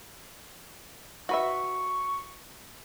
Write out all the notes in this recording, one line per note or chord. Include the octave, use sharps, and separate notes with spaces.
F#4 B4 E5 C#6